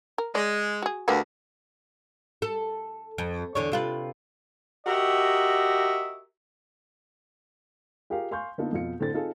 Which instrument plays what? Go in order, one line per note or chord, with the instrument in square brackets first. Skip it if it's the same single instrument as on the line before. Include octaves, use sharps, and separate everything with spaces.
[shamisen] A#4
[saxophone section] G#3 [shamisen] D5
[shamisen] F#4 G#4
[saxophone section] D2 [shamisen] G3 A#3 B3
[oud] A4
F2
E2 D3 C#5
C3 F4 B4
[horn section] F#4 G4 A#4 D#5 E5
[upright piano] F4 G4 G#4 A#4 F5
F5 G#5 C6 C#6 G6
D3 A#3 B3 D#4 F4 A4
F2 B2 F4 C#7
A2 D3 C4 A4 A6
C4 D#4 F4 G#4 A4